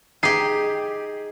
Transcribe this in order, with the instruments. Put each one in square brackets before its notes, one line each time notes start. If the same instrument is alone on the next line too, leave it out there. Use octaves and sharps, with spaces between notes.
[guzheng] D#4 G4 [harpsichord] G#4 [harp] C7